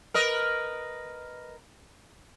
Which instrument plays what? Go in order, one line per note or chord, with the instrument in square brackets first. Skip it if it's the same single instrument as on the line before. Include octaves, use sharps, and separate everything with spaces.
[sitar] A#4 B4 D#5